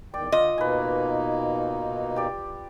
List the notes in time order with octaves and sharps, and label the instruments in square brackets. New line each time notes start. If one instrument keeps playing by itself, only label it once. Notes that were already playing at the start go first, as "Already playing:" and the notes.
[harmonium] E2 D#3 G5 [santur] D5
[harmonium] D3 [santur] F4 [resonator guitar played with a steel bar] D#5
[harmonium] B2 A#3 D#4 [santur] B4 G#5
[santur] G4 D5